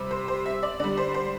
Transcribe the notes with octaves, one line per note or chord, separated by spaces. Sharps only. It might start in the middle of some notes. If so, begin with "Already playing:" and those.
Already playing: C3 G3
C5
C5
E5
D5
D3 G3 D5
C5
C5